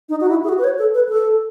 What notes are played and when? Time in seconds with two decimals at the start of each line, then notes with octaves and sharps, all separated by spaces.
0.09 D#4
0.20 F#4
0.29 E4
0.44 G#4
0.49 F#4
0.58 B4
0.64 C#5
0.78 A4
0.94 B4
1.09 A4